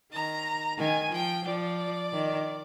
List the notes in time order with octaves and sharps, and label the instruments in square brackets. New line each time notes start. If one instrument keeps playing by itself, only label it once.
[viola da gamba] D#3 [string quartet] A#5
[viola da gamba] D#3 [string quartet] G#5
[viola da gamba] F3 [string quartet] G5
[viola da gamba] F3 [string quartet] D5
[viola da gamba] D#3